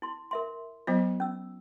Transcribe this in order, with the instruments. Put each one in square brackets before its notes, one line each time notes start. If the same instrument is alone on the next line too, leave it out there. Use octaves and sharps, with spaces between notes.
[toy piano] E4 C6
A#4 E5 C6
[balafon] F#3 B3 C5 [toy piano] F4
[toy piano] C#4 E6